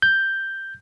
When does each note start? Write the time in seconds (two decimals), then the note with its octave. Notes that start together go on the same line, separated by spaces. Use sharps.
0.02 G6